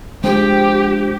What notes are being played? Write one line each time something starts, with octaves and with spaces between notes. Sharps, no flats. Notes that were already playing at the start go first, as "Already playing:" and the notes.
F3 G#3 D4 G4 G#4 G5